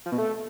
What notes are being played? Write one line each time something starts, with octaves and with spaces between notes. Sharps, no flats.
F3
B2
A3